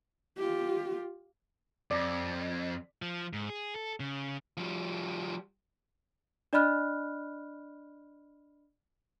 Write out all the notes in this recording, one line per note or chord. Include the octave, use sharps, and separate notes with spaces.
F4 G4
F2 D5
F3
G#2
G#4
A4
C#3
F3 G3
D4 D5 D#5 B5 F6 F#6